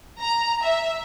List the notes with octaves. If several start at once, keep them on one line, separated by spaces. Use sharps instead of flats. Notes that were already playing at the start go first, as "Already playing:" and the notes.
A#5
E5